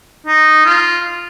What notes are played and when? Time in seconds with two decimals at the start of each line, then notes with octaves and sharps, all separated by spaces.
0.26 D#4
0.65 F4